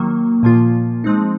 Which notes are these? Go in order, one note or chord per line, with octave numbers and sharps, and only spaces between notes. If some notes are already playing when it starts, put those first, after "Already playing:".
Already playing: D#3 F#3 A#3
A#2 F3 A#3 F4
F3 G#3 C4 D#4